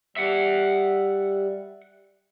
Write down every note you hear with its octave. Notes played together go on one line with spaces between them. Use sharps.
G3 E5 F#5